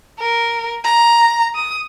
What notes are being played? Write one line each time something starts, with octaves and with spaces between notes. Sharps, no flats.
A#4
A#5
D#6